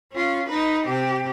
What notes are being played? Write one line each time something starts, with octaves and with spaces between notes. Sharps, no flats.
C#4 F4
D#4 B4
C3 G4